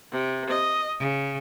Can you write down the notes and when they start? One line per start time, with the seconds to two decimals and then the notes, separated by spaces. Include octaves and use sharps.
0.14 C3
0.50 D#5
1.00 C#3